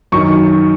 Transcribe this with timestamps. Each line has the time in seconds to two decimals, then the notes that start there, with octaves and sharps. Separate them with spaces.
0.12 F#2 D#3 F#3 C#6